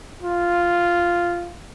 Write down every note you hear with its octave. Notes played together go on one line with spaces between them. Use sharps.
F4